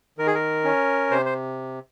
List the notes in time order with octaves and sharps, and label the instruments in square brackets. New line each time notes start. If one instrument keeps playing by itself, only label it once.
[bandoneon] D#3 A#4
G#4
A#4
C#4
C3 C5
C5